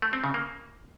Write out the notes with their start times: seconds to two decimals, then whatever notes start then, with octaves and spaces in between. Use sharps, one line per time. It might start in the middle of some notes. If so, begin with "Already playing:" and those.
0.02 A3
0.13 C4
0.24 C#3
0.34 A#3